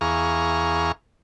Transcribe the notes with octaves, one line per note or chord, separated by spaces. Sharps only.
E2 G#4 F5 A#5 C#6